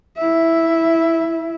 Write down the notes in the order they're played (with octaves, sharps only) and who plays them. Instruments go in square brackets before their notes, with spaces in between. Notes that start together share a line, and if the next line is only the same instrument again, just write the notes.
[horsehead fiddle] E4 E5